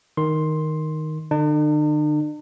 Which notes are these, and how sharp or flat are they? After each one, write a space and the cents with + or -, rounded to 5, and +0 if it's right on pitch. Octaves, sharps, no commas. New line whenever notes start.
D#3 +0 C6 +10
D3 +35 D4 +45